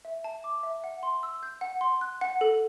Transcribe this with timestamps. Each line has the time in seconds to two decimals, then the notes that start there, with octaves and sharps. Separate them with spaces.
0.05 E5
0.24 A5
0.44 D6
0.63 E5
0.84 F#5
1.03 C6
1.23 E6
1.43 G6
1.61 F#5
1.81 C6
2.01 F#6
2.21 F#5
2.41 A4